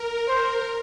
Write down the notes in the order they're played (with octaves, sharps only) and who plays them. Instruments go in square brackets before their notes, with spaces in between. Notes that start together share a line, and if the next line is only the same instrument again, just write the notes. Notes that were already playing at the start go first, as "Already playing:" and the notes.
Already playing: [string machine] A#4
[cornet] C5